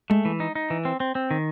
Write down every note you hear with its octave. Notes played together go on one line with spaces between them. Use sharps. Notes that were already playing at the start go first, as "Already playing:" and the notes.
G#3 A3
E3
D#4
D#4
E3
C4
C4
C4
D#3